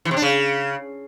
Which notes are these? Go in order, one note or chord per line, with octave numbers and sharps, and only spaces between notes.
E3
C3
D4
C#3